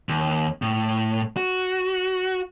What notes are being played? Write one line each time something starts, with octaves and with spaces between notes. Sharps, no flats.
D#2
A2
F#4